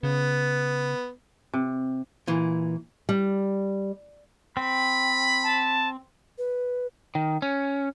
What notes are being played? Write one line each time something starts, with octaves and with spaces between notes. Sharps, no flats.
C#3 B3
C3
A#2 E3
G3
C4 B5
A5
B4
D#3
C#4